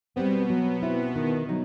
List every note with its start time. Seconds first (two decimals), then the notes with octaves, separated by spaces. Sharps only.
0.16 B2 G3 B3 C4
0.50 F#3
0.83 C4 E4
1.16 D#3
1.49 F#3 D#4